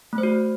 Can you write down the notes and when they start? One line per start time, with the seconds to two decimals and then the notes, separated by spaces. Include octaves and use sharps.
0.13 A3
0.18 C5
0.23 F#4